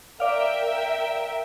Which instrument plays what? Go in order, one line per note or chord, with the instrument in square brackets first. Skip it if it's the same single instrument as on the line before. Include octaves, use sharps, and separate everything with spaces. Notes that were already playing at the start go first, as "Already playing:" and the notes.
[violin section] A#4 E5 G5 [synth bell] D5 F5